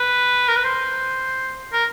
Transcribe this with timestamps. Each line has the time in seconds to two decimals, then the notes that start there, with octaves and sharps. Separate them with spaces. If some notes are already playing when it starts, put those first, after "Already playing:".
Already playing: B4
0.48 A#4
0.56 B4
0.64 C5
1.72 A#4